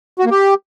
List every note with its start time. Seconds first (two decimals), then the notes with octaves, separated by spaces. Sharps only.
0.19 F#4
0.25 A#3
0.31 G4